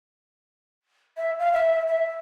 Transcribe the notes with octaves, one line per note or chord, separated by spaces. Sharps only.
E5
F5
E5
E5